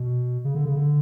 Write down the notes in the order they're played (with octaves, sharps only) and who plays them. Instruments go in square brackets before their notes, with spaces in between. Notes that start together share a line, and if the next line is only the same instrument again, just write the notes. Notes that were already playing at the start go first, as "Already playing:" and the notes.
Already playing: [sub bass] B2
C#3
D3
C#3
D3